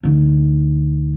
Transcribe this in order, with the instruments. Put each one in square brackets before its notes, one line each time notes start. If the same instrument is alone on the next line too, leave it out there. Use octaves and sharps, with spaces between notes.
[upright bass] D2 D#4